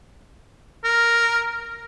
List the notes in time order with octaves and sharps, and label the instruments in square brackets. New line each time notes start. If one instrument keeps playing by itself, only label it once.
[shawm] A#4